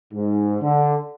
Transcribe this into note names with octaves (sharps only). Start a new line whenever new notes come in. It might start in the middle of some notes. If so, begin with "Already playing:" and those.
G#2
D3